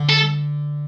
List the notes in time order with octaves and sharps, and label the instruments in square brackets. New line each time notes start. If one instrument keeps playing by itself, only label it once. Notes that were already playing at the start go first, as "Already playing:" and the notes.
Already playing: [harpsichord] D3
[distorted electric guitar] A4